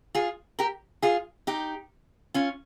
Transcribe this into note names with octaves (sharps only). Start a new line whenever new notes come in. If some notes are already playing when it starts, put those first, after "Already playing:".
F4 G#4
G4 A#4
F4 G#4
D#4 G4
C#4 F4